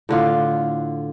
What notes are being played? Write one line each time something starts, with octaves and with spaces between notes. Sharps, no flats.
A2 D3 F4